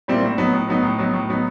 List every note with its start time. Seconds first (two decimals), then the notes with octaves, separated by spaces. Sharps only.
0.08 A#2 G3 C4 E4
0.23 A2
0.38 F#3 B3 D#4
0.53 A2
0.68 F#3 B3 D#4
0.83 A2
0.98 F#3 B3 D#4
1.13 A2
1.29 F#3 B3 D#4